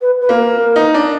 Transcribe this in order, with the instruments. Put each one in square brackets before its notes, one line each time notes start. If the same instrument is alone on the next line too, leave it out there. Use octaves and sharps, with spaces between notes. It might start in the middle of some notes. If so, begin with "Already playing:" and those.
[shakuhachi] B4
B4
[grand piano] A#3
[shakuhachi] A#4
[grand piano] D#4
D4